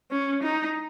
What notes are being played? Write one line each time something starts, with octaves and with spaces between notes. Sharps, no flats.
C#4
D#4